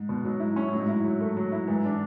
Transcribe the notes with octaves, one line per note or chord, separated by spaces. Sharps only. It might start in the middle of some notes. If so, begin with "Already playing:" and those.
Already playing: G#2
B2
G#2 F#3
G#2 E4
G#2 C#4
A2 F#3
G#2
E4
F#3
A3
F#3
E4
G#2 E3
D4